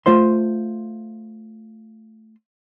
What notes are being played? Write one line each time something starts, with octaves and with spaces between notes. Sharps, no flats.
A3 F4 C5 C6